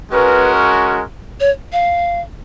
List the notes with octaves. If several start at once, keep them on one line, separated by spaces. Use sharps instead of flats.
G#3 C#4 F#4 A#4 B4
C#5
F5